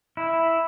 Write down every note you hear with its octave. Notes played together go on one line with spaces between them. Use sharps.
E4